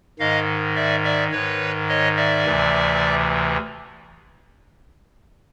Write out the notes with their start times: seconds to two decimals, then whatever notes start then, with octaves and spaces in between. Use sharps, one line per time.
0.19 G#2 D#3 D#5 F5
0.76 D5 E5
1.04 D5 E5
1.32 G#2 D#3 B4 C#5
1.89 C#5 D#5
2.17 D5 E5
2.45 D2 C3 E3